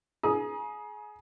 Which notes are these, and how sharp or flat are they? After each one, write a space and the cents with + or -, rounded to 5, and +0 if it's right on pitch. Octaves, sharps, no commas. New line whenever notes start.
G#4 +25 A#5 +35 D#6 +0